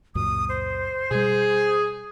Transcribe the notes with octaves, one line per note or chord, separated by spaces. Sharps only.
C#2 F#2 A#2 D#6
C5
B2 G3 G#4